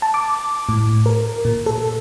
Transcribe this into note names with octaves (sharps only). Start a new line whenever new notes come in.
A5
D6
A2
A#4
A#2
A4